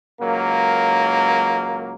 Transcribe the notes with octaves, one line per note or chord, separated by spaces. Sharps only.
C#2 F#3 A#3